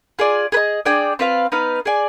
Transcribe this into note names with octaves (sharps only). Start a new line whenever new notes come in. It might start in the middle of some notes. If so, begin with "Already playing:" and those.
F4 G#4 D5
G#4 B4 D#5
D4 G#4 D5 G5
C4 F4 B4 F5
B3 D#4 B4 F5
G#4 D5 G#5